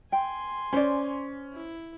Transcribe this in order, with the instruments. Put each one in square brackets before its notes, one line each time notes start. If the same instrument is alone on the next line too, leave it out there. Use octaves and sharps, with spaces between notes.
[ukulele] G5 [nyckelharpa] G#5 C6
[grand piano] C#4 [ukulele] C5 D5
[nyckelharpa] E4